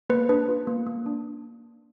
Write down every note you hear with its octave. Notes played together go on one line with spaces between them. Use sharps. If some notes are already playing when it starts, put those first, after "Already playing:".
A#3 B4
D4 B4
F4
A#3
A#3
D4